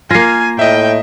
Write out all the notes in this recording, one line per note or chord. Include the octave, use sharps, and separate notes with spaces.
A#3 F4 G#5 A#6 C7
A2 D#5 E5 G5